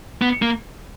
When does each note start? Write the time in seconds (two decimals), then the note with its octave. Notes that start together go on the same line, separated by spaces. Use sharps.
0.22 B3
0.42 A#3